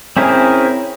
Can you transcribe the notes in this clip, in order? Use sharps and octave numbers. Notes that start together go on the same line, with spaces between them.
C4 C#4 E4 G#4 A#4